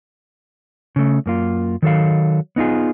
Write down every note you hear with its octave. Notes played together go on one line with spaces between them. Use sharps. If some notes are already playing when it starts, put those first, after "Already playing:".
C#3 A3
F#2 A#3 F4
D#3 F#3 A4 F5
B3 D#4 F4 G#4